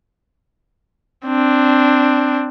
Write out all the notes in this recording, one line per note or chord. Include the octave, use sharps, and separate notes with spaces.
C4 D4